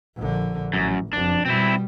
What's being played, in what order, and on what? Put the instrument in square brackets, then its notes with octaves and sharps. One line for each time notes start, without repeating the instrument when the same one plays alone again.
[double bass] A#1 D3
[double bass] A1 [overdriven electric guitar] F#2
[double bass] F#1 F2 [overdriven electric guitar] D4
[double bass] B2 G3 [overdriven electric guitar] C4 E4